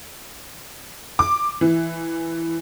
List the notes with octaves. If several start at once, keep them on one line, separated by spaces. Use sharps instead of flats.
D6
E3